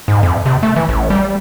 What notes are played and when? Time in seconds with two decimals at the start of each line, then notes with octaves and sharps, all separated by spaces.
0.08 G#2
0.23 F2
0.46 C3
0.63 A3
0.76 E3
0.89 A1
1.10 G3